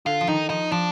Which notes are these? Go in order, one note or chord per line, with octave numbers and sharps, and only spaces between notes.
D3 F4
F3
D#3 D#4
F3 D#4
F3 D4